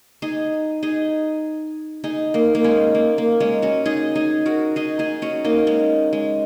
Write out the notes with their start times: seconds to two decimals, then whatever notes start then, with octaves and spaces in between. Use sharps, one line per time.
0.22 D#4 G#4
0.83 D#4 G#4
2.04 D#4 G#4
2.34 A#3 D#4
2.55 A#3
2.64 G#3 C#4
2.94 A#3
3.18 A#3
3.40 G#3 C#4
3.62 C#4 F#4
3.86 D#4 G#4
4.16 D#4 G#4
4.46 F#4 A#4
4.76 D#4 G#4
4.99 D#4 G#4
5.22 C#4 F#4
5.45 A#3 D#4
5.67 G#3 C#4
6.13 G#3